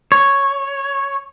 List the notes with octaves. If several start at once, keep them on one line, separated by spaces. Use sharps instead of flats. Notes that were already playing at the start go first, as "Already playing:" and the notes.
C#5